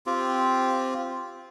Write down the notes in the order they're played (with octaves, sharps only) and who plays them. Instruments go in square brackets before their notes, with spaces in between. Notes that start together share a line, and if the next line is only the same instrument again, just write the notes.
[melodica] C4 F4 G4